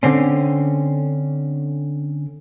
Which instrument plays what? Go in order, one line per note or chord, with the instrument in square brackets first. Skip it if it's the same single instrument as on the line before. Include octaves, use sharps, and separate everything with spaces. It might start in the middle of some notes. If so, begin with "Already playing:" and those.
[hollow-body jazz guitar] D3 C4 C#4